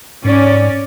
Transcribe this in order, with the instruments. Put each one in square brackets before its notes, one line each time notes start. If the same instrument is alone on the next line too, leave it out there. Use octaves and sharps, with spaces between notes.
[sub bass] G#2 [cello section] C#4 D5